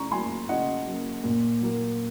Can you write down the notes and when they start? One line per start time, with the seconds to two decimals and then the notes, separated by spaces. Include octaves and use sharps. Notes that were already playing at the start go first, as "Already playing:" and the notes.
Already playing: C#3 A#5 C#6
0.11 F#3 A#3 G#5 C6
0.49 C#3 D#5 F#5
0.87 F#3 A#3
1.24 A#2
1.61 F#3 A#3